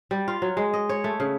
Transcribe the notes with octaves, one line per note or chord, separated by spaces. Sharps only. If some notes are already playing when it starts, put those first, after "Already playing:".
G3
F4
F#3
G#3
D#5
C#5
A3
C#3